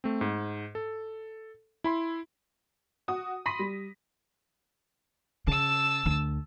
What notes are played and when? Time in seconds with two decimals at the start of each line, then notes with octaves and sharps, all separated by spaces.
0.04 A3 C4
0.21 G#2
0.75 A4
1.84 E4 B5 C6
3.08 F#4 D#6
3.46 B5 C6 A#6 B6 D#7
3.59 G3
5.47 C#3 A5 E6
6.06 D2